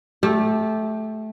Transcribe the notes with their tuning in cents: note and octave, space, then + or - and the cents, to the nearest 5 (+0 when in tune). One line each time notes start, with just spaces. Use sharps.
A3 -15 G4 +5